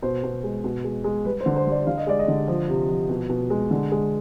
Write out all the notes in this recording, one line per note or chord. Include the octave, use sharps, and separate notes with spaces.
B2 C5
B2
G#3
B2
G#3
G#3
G3 B4
C5
D3
C5
G3
D5
D3 F5
D#5
G#3 D5
D#5
D3
F3
C3
F3
B2
B2
G#3
D3
G#3